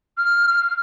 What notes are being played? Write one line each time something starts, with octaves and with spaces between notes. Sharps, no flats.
F6
F6